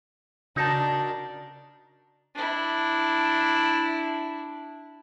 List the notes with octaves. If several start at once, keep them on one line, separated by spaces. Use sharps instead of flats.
C#3 D4 D#4 F#4 A#4 A5
D4 E4